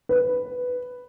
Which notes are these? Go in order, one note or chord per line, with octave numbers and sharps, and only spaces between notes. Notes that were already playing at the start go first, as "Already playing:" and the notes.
B4